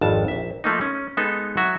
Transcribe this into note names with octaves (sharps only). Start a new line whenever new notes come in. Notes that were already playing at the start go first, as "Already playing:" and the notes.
G#1 F2 A5
A#1 E5
F3 A3 A#3 D#4
C#4
G#3 B3 D#4 A4
F#3 F#4 E5